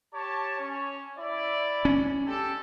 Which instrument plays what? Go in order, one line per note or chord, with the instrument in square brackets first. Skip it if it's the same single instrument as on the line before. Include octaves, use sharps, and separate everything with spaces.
[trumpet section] G4 C#5 A5
C#4
E4 D5
[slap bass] C#4
[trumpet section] G#3 G4 A4